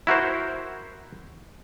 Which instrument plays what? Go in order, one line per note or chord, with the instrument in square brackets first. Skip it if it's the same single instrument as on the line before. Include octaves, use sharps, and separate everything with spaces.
[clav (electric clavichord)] E4 F#4 A#4 C5